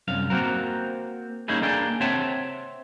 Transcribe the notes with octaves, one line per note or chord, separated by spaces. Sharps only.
C2 F#2 F5
A#3 C4 F#4 A#4
A#3 C#4 D#4 E4 G#4
A#3 D4 G#4 A4 D5 G5
C4 C#5 E5 F#5 G5 A5